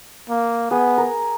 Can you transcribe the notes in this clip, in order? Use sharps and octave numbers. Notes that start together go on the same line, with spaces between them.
A#3
B3 G#4
A#4